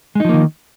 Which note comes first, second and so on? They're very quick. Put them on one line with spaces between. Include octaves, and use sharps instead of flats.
G#3 D#4 F3 A#3 D#3